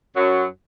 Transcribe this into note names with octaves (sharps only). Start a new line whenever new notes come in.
F#2 F#3